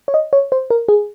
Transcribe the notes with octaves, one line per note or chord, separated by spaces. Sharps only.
C#5
D#5
C#5
C5
A#4
G#4